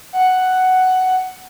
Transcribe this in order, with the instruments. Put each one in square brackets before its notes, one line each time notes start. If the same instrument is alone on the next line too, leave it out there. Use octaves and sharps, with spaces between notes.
[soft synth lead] F#5